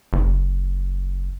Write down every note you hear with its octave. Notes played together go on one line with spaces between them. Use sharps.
F#1